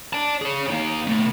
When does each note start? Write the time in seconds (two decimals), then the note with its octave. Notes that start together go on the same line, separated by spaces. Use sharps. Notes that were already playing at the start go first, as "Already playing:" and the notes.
0.13 D5 A5
0.42 G#4 C#5
0.70 A#3 D#4
1.08 B2 A3